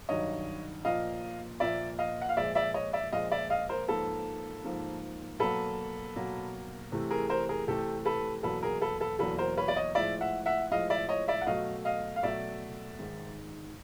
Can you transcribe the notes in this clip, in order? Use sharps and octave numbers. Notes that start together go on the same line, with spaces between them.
G2 D#3 F#3 C#5 D#5
A#2 F3 A#3 D#5 F5
A#2 F3 A#3 D5 E5
D#5 F5
F#5
F5
A#2 F3 G#3 D5 E5
D5 E5
C#5 D#5
D5 E5
A#2 F3 G#3 D#5 F5
D5 E5
D#5 F5
A#4 C5
G#2 F3 A#3 A4 B4
G#2 F3 A#3
B2 F#3 A#3 A4 B4
B2 F#3 A#3
C3 E3 A3
G#4 A#4
A#4 C5
G#4 A#4
C3 E3 A3 G4 A4
A4 B4
E2 B2 F#3 A#3 A4 B4
G#4 A#4
A4 B4
A4 B4
E2 B2 F#3 A#3 A4 B4
A#4 C5
B4 C#5
D5
C#5 D#5
A2 F3 G#3 D5 E5
E5 F#5
E5 F#5
A2 F3 G#3 D#5 F5
D5 E5
C#5 D#5
D5 E5
F#5
B2 F#3 A3 D#5 F5
D#5 F5
F5
B2 F#3 A3 D5 E5
G#2 D#3 G#3